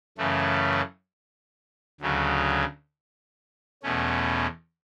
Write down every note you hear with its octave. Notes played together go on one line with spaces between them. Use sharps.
F#2 C#3 E3 A3
D2 C#3 F#3
E2 B2 A3 C#4